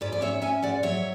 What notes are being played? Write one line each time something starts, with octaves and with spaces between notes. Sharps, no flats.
G#2 B4 D5
D5
C#4 C#5 E5
C#4 E5 G#5
G#2 D5 F#5
F#3 C#5 E5